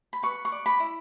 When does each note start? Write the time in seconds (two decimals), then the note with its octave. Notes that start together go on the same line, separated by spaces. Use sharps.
0.13 B5
0.23 B4 C#6
0.45 C#6
0.52 D5
0.66 B5
0.80 E4